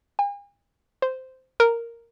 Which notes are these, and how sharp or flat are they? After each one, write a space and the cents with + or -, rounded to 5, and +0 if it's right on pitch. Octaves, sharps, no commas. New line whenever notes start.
G#5 -45
C5 -10
A#4 -5